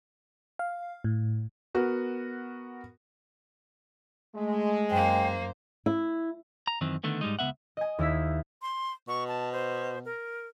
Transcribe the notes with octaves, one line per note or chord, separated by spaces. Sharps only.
F5
A2
B3 F#4 A#4
G#3 A3
F#2 A#3 C5 G5
E4
A#5
F#2 D#3 E3 C4
D3 D#3 A3 B3
G#2 G3 G#3 D#4
C#2 C#3 B3 E5 F#5
D#5 G#5
D#2 E4 E5 B6
C6
B2 C#6
A5
C5
A#4